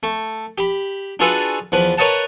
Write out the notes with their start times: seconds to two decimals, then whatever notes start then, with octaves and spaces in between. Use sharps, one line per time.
0.03 A3
0.58 G4 B5
1.19 D4 F4 F#4 G#4 A4 B4
1.72 E2 F3 B4
1.98 A#4 B4 C#5 D#5 F#5 A5